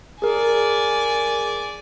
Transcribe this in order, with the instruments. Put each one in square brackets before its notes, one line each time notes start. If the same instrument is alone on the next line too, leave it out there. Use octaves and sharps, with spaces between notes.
[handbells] G#4 A#4 [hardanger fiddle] D5 G#5